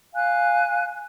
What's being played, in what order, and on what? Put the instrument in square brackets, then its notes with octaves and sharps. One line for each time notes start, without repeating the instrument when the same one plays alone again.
[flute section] F5 G#5 F#6